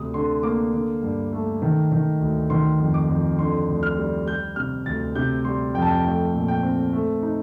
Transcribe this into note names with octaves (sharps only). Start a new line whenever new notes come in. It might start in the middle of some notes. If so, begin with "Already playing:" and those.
Already playing: D2 C3 D#6
D3 C6
A#3 D6
D3
G2
A3
D#3
D#3
D2
D#3 C6
F2
D6
F2
D3 C6
D2
F6
G3
G3 G6
C3 F6
D2 A6
C3 G6
G3 C6
F2 G5
A5
G5
A3 G5
A#2
G5
C4
A3
D#4